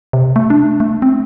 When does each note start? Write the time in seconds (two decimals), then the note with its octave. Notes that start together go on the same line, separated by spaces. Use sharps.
0.13 C3
0.36 A3
0.50 D4
0.80 A3
1.02 C4